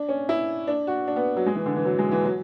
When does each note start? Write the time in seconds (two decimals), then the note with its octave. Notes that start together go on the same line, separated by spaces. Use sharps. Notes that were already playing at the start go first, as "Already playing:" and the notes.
Already playing: D4
0.09 C#4
0.29 E4
0.68 D4
0.87 F#4
1.08 D4
1.16 B3
1.37 F#3
1.46 G#3
1.55 E3
1.66 D3
1.76 E3
1.85 F#3
1.99 G#3
2.11 E3
2.25 F#3